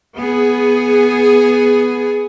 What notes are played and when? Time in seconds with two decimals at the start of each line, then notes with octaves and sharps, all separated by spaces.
0.17 B3 G#4